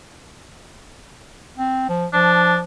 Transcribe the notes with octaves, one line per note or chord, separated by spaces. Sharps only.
C4
F3
F3 D4